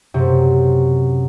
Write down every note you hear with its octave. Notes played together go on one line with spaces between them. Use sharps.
F#2 C3